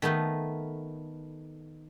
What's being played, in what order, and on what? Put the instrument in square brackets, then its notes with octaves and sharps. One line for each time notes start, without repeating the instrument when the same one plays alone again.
[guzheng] D#3 A3 B3 D#4 B4